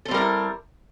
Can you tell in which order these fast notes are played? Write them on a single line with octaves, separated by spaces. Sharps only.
A4 C4 G3 A#4 E4